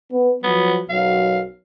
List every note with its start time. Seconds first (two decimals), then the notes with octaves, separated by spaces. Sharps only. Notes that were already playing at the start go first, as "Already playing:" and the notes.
0.11 B3 B4
0.44 F3 F#3 B3
0.90 B1 F#2 F#3 F5